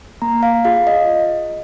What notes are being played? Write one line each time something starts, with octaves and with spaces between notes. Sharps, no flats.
A#3 A#5
F5
F4 G#4 F5
D#5